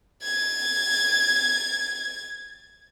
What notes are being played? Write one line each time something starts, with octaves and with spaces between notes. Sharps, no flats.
G#6 A6